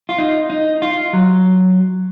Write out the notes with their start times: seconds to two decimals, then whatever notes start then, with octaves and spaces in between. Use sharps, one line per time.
0.09 F4
0.18 D#4
0.50 D#4
0.82 F4
1.13 F#3